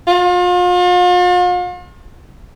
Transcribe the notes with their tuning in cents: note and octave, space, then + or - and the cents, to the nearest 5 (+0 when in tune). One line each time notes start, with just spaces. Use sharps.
F4 +40